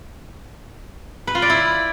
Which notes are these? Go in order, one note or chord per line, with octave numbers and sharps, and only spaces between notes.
B4
F4
D5
E4